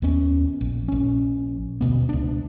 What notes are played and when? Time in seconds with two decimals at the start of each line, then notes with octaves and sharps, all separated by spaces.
0.02 D#2 B3 C#4
0.61 A#1
0.88 A#1 C#4
1.81 D#1 D2 B2 B3
2.09 C#2 D4